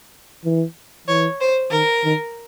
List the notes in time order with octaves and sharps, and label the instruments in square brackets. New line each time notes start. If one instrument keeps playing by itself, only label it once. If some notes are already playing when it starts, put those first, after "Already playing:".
[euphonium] E3
[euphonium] E3 [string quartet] C#5
[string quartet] C5
[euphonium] D#3 [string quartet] A#4
[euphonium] D#3